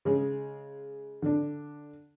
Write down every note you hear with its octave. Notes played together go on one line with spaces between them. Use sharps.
C#3 G#3 G#4
D3 D4